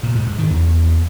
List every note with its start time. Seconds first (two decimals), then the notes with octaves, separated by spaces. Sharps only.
0.03 A#2
0.15 G#2
0.27 G#2
0.39 D#3
0.50 E2